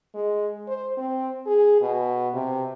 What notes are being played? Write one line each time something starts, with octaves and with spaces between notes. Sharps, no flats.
G#3
C5
C4
G#4
B2
C3